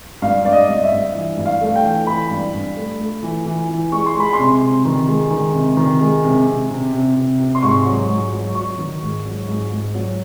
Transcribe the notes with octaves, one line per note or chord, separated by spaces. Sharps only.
G2 F5
G2 D5
D#5
G2
E5
G2
E3
G2
F5
A3
G5
E3
E3 B5
G2
G2
A3
A3
E3
E3
E3
G#3 C#6
C6
G#3 B5
C6
C3
C3
D#3
G#3
D#3
C3
D#3
G#3
C3
C3
C3
C3
C3
C3
C6
G#2 C#6
F#3
G#2
F#3
F#3 C#6
D#3
G#2
F#3
G#2
G#2
F#3